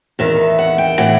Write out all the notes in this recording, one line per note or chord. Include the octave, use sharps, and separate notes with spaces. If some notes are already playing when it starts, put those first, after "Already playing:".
E2 D#3 E5
F#5
G5
A2 E3 F#5